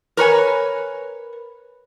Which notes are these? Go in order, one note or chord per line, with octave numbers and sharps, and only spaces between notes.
A#4 B4 C#5 G#5